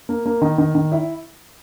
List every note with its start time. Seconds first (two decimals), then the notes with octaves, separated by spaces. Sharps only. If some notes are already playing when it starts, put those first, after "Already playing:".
0.09 A#3
0.26 A#3
0.42 D#3
0.58 D#3
0.75 D#3
0.92 E4